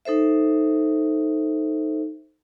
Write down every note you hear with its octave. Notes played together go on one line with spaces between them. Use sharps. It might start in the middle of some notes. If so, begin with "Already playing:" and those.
D#4 A4 C5 E5